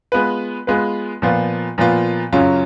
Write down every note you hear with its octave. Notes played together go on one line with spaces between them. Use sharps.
G#3 B3 F4 B4
G#3 B3 F4 B4
A#2 F3 B3 F4
A#2 F3 B3 F4
F#2 C#3 F#3 C#4 F4